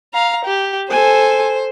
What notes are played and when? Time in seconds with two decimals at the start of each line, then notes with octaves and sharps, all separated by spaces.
0.14 F5 A#5
0.46 G4
0.90 A4 C5 G#5